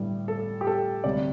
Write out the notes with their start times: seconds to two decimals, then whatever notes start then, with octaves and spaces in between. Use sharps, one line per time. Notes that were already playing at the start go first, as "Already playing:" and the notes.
Already playing: A1 G2 D3 G3
0.28 A4
0.61 G4
0.67 A4
1.04 D2 C3 G3 D5